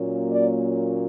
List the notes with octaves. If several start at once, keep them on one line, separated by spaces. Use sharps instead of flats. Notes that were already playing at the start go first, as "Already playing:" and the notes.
Already playing: A#2 F#3 A#3 C#4
D5